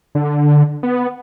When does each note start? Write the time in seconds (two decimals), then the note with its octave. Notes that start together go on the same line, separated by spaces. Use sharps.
0.15 D3
0.83 B3